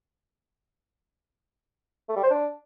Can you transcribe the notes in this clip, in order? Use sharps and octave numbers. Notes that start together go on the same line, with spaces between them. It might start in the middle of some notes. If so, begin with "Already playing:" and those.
A3
G3
C5
D4